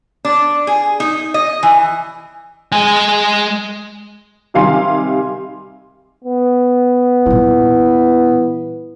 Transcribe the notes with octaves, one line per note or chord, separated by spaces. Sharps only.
D4
G#4
D#4
D#5
E3
G#3 G#5
C3 D#3 G3 F5 G#5 C6
B3
A#2 E3 G3